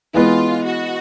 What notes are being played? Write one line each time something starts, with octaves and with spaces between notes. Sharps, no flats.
E3 G#3 B3 F4
F#4